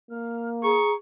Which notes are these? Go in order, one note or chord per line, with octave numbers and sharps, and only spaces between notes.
A#3 F6
G#4 A#5 C#6